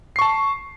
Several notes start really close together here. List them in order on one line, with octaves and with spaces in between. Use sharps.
C7 C#6 A5